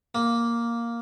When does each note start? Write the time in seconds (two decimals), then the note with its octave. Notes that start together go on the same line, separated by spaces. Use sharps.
0.15 A#3